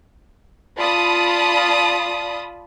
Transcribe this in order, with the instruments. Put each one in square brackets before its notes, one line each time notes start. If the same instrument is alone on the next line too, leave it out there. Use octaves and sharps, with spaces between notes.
[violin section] F4 D5 A5 B5 D#6